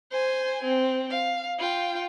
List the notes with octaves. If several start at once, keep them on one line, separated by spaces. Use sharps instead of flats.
C5 G#5
C4
F5
F4 G5